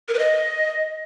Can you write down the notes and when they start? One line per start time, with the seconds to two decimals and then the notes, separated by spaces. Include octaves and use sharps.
0.08 A#4
0.14 B4
0.19 D#5